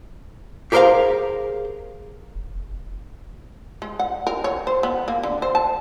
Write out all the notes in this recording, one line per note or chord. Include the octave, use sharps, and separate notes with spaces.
G4 G#4 A#4 C5 F5 A#5
F1
G#3
F#5
A#4
C#5
C5
B3
A#3
D3
C5
A5